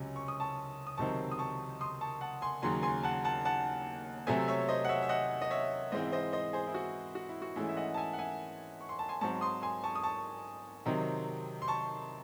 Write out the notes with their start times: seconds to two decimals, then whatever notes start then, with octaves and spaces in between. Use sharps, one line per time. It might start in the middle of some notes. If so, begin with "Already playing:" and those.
Already playing: C#2 C3 F#3 C#4 G#5
0.16 C#6
0.28 D#6
0.40 A5 C#6
0.87 D#6
0.98 C#2 C3 D#3 F#3 C4 A5 C#6
1.31 D#6
1.39 A5 C#6
1.81 C6 D#6
2.01 A5 C#6
2.21 F#5 A5
2.42 G#5 C6
2.62 D#2 C#3 F#3 G#5 C6
2.83 G#5 C6
3.03 F#5 A5
3.24 F#5 A5
3.45 F#5 A5
4.27 C3 F#3 A3 C4 E5 G#5
4.48 C#5 E5
4.69 C5 D#5
4.85 F#5
4.89 C#5 E5
5.03 E5
5.09 D#5 F#5
5.42 D#5
5.50 C#5 E5
5.92 G#2 E3 G#3 C4 C5 D#5
6.06 E5
6.12 C5 D#5
6.33 C5 D#5
6.53 G#4 C5
6.67 E4
6.74 F#4
7.15 F#4
7.29 E4
7.42 F#4
7.56 G#2 E3 A3 C#4 E4 G#4
7.69 E5
7.77 D#5 F#5
7.94 A5
7.97 E5 G#5
8.13 F#5
8.18 E5 G#5
8.81 C#6
8.89 C6
8.99 A5
9.09 G#5 C6
9.21 G#2 F#3 C4 A5 C#6
9.41 C6 D#6
9.62 G#5 C6
9.84 A5 C#6
9.95 D#6
10.03 A5 C#6
10.86 C3 D#3 F#3 C4
11.62 C6
11.68 A5 C#6